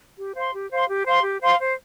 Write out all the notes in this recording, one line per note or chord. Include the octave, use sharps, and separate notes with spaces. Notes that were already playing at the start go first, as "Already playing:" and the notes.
G4
C5 F5 C6
G4
C5 F5 C6
G4
C5 F5 C6
G4
C5 F5 C6
C5